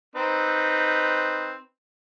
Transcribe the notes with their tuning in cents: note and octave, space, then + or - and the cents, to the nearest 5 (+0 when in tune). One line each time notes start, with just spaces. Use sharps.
C4 +0 D#4 +0 B4 +0